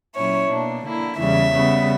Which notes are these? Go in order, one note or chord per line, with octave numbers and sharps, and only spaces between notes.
A#2 F#3 C#4 E4 C#5
B2 A#3 D4
D3 A#3 E4
E2 C#3 E3 G3 E5
C#3 G3 B3